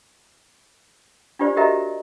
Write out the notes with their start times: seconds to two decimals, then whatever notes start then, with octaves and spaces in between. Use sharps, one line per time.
1.39 D4 F4 G4 C5 D5
1.56 F#4 G4 A#4 D#5 E5 A#5